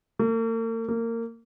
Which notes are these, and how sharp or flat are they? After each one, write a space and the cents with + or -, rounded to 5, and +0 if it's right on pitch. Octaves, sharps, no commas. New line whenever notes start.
A#3 -45
A#3 -25